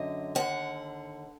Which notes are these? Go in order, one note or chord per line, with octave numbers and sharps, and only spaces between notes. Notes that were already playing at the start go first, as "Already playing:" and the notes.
Already playing: F#2 D3 F#3 D#5
D#2 D3 F3 F#5